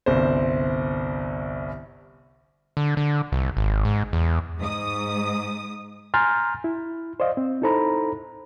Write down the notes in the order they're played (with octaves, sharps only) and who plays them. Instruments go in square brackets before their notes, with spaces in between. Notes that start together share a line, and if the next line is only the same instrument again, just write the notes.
[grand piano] G1 C2 C5
[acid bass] D3
D3
C2
G#1
G#2
E2
[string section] G#2 D#6
[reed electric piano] G#5 A#5 C6 F6 G6 A6
E4
C5 D5 D#5 F5
C4
D#4 E4 A4 C5 A#5 B5